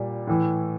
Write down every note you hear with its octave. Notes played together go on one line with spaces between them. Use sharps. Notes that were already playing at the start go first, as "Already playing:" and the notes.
Already playing: A#2 G3
A2 E3